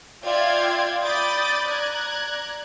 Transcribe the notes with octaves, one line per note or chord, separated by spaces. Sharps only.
F4 D5 E5 F5 G5 G#6
D5 B5 D6 D#6 G6 A6
D5 A#5 F#6 G#6